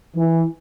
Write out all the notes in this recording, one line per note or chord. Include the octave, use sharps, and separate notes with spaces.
E3